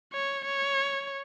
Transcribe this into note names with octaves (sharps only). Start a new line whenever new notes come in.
C#5
C#5